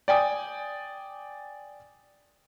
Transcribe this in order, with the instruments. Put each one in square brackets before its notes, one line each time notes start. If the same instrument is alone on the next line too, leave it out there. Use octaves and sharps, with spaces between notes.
[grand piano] D5 G5 G#5 D#6